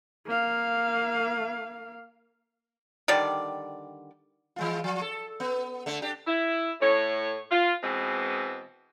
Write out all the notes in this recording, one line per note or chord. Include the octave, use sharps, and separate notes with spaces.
A#3 F5
D3 D#3 G3 D5
E3 G#3 F4
F3
A4
B3
D3 A3
D4 G4
E4
A2 C#5
F4
B2 E3 G#3 C4